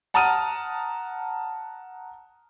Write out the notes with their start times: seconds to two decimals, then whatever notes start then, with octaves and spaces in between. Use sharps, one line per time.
0.14 F#5 A5 A#5 D#6 F6 D#7